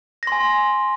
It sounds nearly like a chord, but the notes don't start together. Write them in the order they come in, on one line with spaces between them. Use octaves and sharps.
A#6 C6 G#5